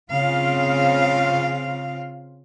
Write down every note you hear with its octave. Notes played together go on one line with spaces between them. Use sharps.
C#3 C4 F4 F5